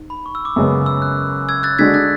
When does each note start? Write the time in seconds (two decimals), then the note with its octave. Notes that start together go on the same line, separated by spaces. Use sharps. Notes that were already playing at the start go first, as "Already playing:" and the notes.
Already playing: G#2
0.10 B5
0.26 C#6
0.35 E6
0.45 D6
0.56 F#2 C#3 G#3 B3
0.86 E6
1.02 F#6
1.49 E6 G#6
1.63 F#6 A6
1.78 D3 G#3 D4 F#4 G#6 B6
1.94 F#6 A6